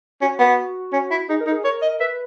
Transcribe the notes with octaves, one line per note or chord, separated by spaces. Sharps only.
C#4 F#4
B3
C#4
E4
D#4 G#4
A#4
D#4
G#4
A#4 C#5
D#5
B4 E5